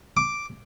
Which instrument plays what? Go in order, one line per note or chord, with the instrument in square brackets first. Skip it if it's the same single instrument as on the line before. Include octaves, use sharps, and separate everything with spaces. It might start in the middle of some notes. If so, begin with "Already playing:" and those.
[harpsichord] D6